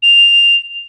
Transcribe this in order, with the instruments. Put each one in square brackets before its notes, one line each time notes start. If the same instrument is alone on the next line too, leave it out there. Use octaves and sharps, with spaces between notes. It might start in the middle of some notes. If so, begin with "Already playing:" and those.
[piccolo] F7